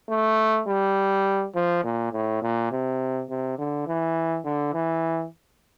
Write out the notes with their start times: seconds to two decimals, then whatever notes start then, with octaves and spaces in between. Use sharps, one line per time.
0.10 A3
0.68 G3
1.55 F3
1.84 A#2
2.13 A2
2.42 A#2
2.72 C3
3.30 C3
3.59 D3
3.87 E3
4.45 D3
4.74 E3